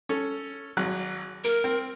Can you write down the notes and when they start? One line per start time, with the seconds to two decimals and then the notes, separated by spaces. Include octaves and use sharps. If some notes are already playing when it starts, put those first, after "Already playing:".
0.09 C#4 A4
0.77 G#1 F#3 F#6
1.44 A#3 A#4
1.64 C4